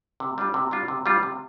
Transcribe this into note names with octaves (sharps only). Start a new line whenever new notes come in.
C3
G3 D4 F4
C3
G3 D4 F4
C3
G3 D4 F4
C3